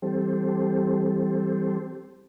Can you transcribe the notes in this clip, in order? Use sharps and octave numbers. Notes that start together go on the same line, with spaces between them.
E3 G3 C4 G4 A4 C5